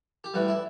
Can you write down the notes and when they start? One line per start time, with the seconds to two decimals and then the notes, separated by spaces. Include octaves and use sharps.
0.24 G4
0.34 A2 E3 G3 F#4
0.48 E4